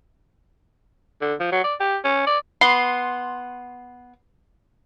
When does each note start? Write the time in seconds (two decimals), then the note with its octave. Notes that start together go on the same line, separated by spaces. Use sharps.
1.21 D3
1.40 F3
1.52 F#3
1.64 D5
1.80 G4
2.04 C#4
2.27 D5
2.61 B3 C6